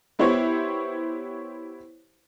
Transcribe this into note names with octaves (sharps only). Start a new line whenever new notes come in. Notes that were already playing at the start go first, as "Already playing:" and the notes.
B3 E4 G4 C5 C#5